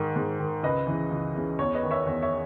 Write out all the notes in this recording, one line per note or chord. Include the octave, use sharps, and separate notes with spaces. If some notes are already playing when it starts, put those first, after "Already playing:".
Already playing: G#2 D#3
G#2
D#3
C#2 B4 D#5
C#3 E3
C#2
C#3 E3
E2 C#5
B4 D#5
D#3
C#5 E5
E2 C#5
C#5 E5